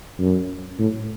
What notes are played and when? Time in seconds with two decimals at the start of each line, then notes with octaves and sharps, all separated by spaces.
0.19 F#2
0.79 A2